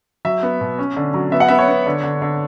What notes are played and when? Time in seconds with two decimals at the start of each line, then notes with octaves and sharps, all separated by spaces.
0.25 F#3 E5
0.43 B3
0.61 B2
0.79 C#4
0.97 D3
1.14 F#3
1.32 B3 E5
1.40 F#5
1.48 B3 E5
1.59 C#5
1.68 B3
1.86 D3
2.03 D3
2.22 D3